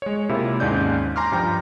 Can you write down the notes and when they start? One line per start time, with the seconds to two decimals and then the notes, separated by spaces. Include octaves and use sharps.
0.02 G#3 C#5
0.29 C3 A#3 E4 F4
0.60 D#2 G#2 C#4 D5 G6
1.16 G#5 A#5 C6 D6 F6
1.32 G2 F3 G5 A#5 G6